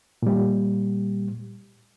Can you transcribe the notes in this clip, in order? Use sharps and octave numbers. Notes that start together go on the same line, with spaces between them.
A#2 G3